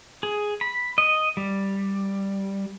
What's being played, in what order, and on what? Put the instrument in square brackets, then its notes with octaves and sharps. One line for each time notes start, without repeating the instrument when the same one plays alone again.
[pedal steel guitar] G#4
B5
D#5
G3